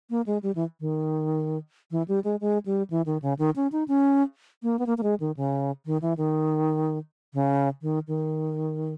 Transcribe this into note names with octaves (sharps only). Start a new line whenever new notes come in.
A#3
G#3
G3
E3
D#3
E3
G3
G#3
G#3
G3
E3
D#3
C#3
D#3
C#4
D#4
C#4
A#3
B3
A#3
A#3
G#3
D#3
C#3
D#3
E3
D#3
C#3
D#3
D#3